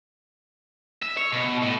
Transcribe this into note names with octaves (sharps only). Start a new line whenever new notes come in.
E5
C#5
B2
A2